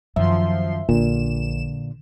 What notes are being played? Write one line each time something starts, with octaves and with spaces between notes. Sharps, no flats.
F#2 D#3 F3 E5 C6
A#1 A#2 D3 E7